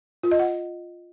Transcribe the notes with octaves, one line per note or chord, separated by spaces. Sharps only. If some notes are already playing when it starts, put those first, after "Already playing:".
F4
D#5
F#5